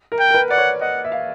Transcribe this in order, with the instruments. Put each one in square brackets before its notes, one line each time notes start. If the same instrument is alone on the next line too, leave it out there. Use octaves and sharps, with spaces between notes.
[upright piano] A#4
[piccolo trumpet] G5
[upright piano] A#4
B4
[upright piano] D5 [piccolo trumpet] F#5
[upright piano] C#5
[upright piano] D#5 [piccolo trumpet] F#5
[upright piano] E5
F5